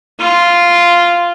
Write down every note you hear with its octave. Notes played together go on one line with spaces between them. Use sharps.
F4